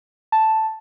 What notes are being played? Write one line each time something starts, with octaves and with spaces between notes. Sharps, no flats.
A5